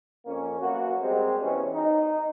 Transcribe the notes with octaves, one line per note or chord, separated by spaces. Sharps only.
F2 A#3 C#4
F#2 A#3 B3 F#4
G3 G#3 A#3 C4 G4 C5
B2 E3 G3 C#4
D#4